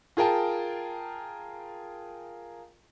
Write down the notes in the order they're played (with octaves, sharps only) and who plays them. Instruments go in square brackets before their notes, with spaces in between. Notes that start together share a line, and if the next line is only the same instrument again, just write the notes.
[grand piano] F4 G#4 A#4 G5 A5